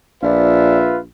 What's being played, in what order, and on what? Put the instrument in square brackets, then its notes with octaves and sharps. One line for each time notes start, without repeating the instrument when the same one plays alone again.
[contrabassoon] A#1 [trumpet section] F4 B4 E5 [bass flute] D5